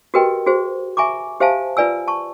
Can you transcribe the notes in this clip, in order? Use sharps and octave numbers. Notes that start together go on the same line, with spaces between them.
F#4 G4 A#4 B4 D#5 G5
F#4 G#4 C5
E5 G#5 A#5 C#6 D6
G4 C5 E5 F5 G#5 A5
F4 B4 D5 G#5 E6
A5 C#6